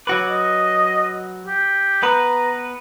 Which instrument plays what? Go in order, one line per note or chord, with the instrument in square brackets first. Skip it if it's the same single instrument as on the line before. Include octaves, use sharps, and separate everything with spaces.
[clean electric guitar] F#3 F#4 B4 [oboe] D6
[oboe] D#5
G4
[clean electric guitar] B3 B4 [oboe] A#5